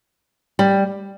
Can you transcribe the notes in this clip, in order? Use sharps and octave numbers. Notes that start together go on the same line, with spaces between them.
G3